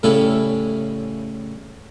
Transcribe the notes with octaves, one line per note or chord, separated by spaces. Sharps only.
A2 C#3 G3 C#4 E4 A4